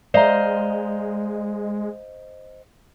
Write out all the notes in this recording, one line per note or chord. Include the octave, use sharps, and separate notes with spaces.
G#3 C5 D5 D#5 F5 A#5